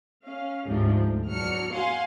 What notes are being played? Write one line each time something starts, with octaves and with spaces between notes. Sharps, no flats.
C#4 F5
D2 G#2 C3 F3 D4
D2
E2 F#3 D4 F6 C#7
F5 F#5 G#5 C6